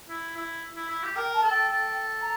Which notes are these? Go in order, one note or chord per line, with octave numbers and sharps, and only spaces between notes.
E4
E4
E4
E4
G4
A#4 G5
A5
A4
G5
A4
A#5